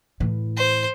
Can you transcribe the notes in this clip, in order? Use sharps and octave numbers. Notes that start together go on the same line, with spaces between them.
A2 E3
C5